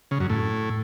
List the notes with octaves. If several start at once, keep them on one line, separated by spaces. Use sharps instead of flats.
C#3
F#2
A2